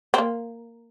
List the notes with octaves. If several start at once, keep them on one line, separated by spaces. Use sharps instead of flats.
C4
A#3